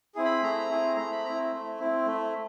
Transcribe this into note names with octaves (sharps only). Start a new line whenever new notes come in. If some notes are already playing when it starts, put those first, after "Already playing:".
C4 E4 G#4
B5
A3 A#5
C4 E4 G#4
A3 A#5
B5
C4 E4 A#5
A3
C4 E4
A3